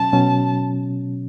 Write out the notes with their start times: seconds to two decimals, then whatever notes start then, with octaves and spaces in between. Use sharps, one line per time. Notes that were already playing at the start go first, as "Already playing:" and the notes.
Already playing: B2 F#3 C#4 A5
0.13 B2 F#3 C#4